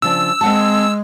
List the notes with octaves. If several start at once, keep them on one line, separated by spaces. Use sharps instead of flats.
C#3 F3 D4 E6
G#3 C4 F#5 A5